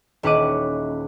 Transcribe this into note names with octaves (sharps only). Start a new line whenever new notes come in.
D#1 C#4 E4 F#5 D6 D#7